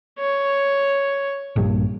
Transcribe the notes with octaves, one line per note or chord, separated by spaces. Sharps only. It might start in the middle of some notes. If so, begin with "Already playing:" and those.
C#5
A#1 G2 A#2